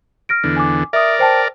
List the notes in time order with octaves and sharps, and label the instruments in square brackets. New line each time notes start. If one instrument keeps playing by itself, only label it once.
[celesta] F6 A#6 D7
[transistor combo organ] E2 D3
[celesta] G#5 D6
[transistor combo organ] A#4 D5 [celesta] E5 D#6
[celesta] C5 G5 A5